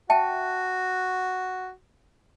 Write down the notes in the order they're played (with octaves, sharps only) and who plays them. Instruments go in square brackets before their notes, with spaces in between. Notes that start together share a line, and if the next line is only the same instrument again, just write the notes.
[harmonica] F#4 [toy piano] E5 G5 A5